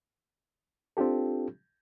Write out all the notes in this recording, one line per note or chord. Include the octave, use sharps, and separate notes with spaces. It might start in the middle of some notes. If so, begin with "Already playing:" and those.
C4 D4 F4 G4 A4